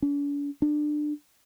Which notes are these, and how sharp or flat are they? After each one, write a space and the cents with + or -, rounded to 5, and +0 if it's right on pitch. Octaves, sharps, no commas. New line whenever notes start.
D4 -45
D4 +25